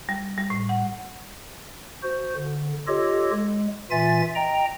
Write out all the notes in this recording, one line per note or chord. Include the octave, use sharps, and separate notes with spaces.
G3
G3
A2
F#5
F#4 C5
D3
F4 G4 A4 C#5 D#5
G#3
A#2 E3 F4 E5 G#5 A6
D#5 G5 A#5